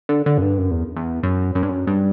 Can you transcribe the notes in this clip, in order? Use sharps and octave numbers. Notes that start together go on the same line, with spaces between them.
D3
D3
F#2
G2
F#2
E2
E2
F#2
F#2
G2
F#2
G2